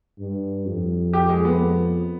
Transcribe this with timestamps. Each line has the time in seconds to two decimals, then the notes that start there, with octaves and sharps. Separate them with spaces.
0.19 G2
0.66 F2
1.13 G4
1.29 G#3
1.45 B3